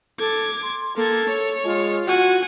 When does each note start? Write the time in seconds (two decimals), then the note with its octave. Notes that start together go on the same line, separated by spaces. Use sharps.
0.19 A4 D6 G#6
0.63 C6
0.96 A#3 A4 G#6
1.29 C#5
1.65 G#3 F4
2.08 F#4 F#5 G#5